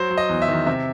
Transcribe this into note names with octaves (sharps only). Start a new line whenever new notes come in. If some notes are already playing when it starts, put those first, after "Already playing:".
Already playing: F#3 C5
F#3
D#5
E2
E5
D#3
C3 E5